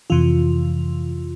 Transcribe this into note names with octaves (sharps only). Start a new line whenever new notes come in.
F2 C3 E3 F4